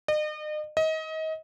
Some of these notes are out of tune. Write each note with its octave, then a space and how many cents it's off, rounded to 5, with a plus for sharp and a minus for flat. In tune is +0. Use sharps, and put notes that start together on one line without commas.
D#5 -40
D#5 +30